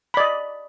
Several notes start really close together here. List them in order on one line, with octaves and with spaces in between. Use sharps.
B5 D5 D#5